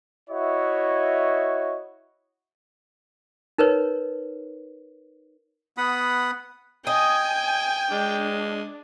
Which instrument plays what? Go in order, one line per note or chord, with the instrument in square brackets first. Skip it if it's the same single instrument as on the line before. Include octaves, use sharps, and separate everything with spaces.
[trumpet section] E4 F#4 C#5 D#5 E5
[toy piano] D#4 A#4 B4 C#5
[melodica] B3 F#5 B5 D#6
[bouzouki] D#5 [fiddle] G5 [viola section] G#5
[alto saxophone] G#3 [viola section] D4